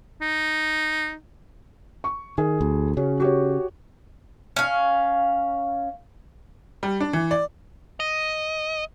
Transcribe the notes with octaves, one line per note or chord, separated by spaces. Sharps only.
D#4
C#6
D#3 G#4
D2
C#3 C#4 F#4
F#4 G4 C#5
C#4 F5
G3
D4
E3
D5
D#5